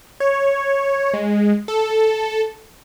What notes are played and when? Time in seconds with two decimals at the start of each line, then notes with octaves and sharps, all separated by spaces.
0.20 C#5
1.14 G#3
1.68 A4